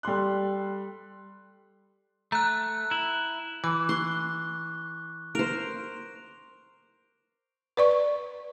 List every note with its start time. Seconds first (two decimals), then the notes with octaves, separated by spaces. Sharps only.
0.03 G3 A4 C6 F#6
2.32 A3 A#5 F#6
2.91 E4
3.64 E3 D6
3.89 C6 C#6 F#6
5.35 A#4 C5 D7 F7
7.77 B4 D5 C#6